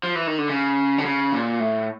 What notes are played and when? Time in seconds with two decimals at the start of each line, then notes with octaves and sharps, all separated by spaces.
0.03 F3
0.15 E3
0.27 D#3
0.38 D3
0.50 C#3
0.98 D3
1.05 C#3
1.32 A#2
1.60 A2